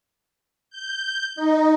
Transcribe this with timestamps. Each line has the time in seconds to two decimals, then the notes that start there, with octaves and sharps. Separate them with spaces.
0.70 G6
1.36 D#4